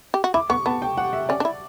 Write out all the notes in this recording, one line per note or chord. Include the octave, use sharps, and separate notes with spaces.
G4
F#4
E4 D6
B3 C#6
B3 A5
G5
F#5
E5
C#4 D5
D4
E4